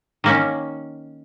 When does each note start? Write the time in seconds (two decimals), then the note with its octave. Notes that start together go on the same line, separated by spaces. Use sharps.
0.24 D#3 A#3 C#4